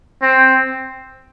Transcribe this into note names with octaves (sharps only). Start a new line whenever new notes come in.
C4